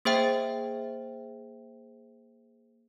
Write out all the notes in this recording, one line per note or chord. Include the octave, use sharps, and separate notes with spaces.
A#3 G#4 C5 E5 G5